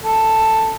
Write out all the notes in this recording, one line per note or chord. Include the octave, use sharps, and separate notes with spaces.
A4